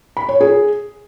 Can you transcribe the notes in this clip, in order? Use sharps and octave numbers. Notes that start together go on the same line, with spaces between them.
B5
C#5
G#4